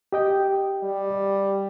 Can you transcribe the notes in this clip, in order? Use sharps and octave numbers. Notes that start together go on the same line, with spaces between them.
G4 D#5 G5
G3